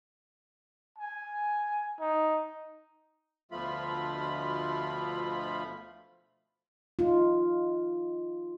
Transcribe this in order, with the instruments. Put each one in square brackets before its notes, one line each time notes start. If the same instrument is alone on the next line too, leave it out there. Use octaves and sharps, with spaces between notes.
[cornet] G#5
D#4
[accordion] D2 B2 F3 A3 F4 B5
[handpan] D#4 F4